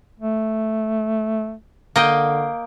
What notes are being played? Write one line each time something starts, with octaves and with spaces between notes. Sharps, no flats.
A3
D3 A#3 D#5 G5